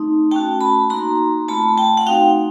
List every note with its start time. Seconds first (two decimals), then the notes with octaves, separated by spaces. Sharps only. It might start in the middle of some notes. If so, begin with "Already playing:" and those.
Already playing: A3 C4 D#4
0.31 A3 C#4 F#4 G5 A5
0.61 A5 B5
0.90 A#3 D#4 F#4 A#5 C6
1.48 A3 C4 F4 A5 B5
1.77 G5 A5
1.97 F#5
2.06 A3 C4 D#4 F#4 F5 G5